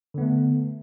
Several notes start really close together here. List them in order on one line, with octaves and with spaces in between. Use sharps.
D3 B3 A3